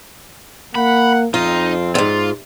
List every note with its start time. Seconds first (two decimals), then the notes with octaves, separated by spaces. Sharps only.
0.75 A#3 F#5 B5
1.34 F2 C4 D#4 F4
1.95 E2 G#2 F4